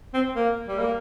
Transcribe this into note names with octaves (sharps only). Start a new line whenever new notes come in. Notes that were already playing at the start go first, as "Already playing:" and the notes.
C4
A#3
G3
A#3